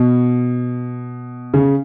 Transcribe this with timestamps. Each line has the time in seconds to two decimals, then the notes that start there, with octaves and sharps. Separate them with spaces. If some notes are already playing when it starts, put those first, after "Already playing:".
Already playing: B2
1.54 C#3